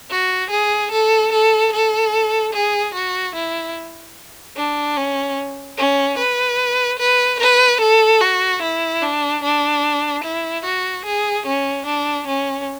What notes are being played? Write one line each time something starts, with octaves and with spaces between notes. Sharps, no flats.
F#4
G#4
A4
A4
A4
G#4
F#4
E4
D4
C#4
C#4
B4
B4
B4
A4
F#4
E4
D4
D4
E4
F#4
G#4
C#4
D4
C#4